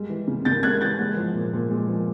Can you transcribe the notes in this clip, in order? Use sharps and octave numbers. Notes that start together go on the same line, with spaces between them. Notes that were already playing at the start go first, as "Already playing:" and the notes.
Already playing: G3 G#3
E3
C#3
C#3 G6 A6
G#3 F#6 G#6
E3 G6 A6
G#3
F3
A#2
A#2
G#3
F3